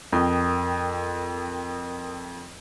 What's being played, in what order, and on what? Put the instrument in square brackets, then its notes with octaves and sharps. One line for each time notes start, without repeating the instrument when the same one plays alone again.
[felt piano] F2 [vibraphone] A#4 G5 D#6